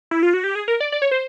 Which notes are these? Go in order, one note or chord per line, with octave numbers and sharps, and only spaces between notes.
E4
F4
F#4
G4
G#4
A#4
D5
D5
C#5
C5